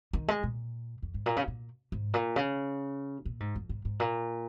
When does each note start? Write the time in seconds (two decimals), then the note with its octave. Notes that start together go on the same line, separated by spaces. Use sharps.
0.13 D#3
0.28 G#3
0.43 A#2
1.02 F2
1.14 G#2
1.26 A#2
1.37 C#3
1.48 A#2
1.92 G#2
2.14 A#2
2.36 C#3
3.25 A#2
3.40 G#2
3.55 F2
3.69 G#2
3.85 G#2
4.00 A#2